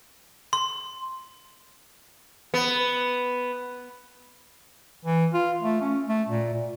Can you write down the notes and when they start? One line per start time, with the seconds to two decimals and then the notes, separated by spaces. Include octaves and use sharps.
0.53 C6
2.54 B3
5.05 E3
5.33 F4
5.62 A3
5.81 C#4
6.09 A3
6.29 A#2
6.54 A#2